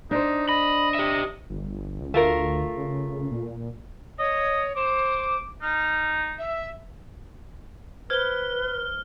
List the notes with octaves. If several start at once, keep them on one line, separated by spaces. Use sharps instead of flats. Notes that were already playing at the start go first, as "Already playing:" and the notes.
D4 D#4 C5
D#5 B5
G4 E5
G1
C#2
D2 A3 F4 A#4
C#3
A#2
C#5 D#5
C5 D6
D#4 F6
E5
B4 C5 F6 G#6 G7